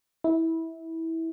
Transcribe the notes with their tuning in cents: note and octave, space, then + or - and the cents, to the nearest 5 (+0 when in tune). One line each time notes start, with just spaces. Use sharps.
E4 -20